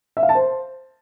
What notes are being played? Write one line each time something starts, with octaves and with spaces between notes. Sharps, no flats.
E5
F5
A5
C5